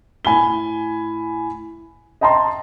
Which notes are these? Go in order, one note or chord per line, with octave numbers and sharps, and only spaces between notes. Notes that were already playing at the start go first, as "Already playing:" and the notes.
A2 G#5 B5 G7
D#5 G5 A5 A#5 C6